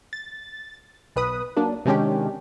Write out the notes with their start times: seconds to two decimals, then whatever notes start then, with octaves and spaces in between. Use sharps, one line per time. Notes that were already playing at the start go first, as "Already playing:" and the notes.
0.13 A6
1.16 B1 B4 D#6
1.56 F#3 A#3 D4
1.86 C3 D#3 G#3 C#4 D4 G4